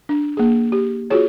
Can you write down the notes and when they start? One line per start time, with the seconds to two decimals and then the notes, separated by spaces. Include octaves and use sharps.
0.09 D4
0.37 A#3 G#4
0.72 G4
1.10 F4 F#4 G#4 C#5